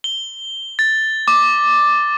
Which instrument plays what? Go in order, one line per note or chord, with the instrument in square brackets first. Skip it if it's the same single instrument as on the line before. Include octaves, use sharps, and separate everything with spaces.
[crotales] G7
A6
D6